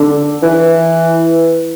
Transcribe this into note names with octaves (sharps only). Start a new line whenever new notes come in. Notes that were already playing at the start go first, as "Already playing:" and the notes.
Already playing: D3
E3